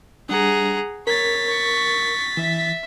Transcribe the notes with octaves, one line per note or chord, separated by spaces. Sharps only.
G3 D4 G#4 F#5 A#5
A#4 C#5 A6 B6
C#6
E3 E5